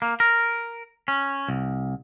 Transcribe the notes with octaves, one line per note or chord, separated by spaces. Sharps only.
A#3
A#4
C#4
C2